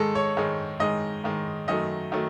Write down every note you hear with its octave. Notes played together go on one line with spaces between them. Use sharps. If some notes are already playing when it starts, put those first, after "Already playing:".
Already playing: G#2 D#3 G#3 A4
C#5
G#2 D#3 G#3
G#2 D#3 G#3 D#5
G#2 D#3 G#3
F#2 D#3 F#3 A3 D#5
D#3 F#3 A3